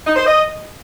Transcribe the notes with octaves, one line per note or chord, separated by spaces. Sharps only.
D#4
C5
D#5